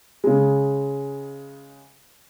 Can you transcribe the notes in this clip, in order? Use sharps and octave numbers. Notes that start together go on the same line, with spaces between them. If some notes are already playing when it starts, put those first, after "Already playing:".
C#3 G#3